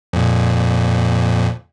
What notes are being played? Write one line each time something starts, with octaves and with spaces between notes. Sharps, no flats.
F2 A#2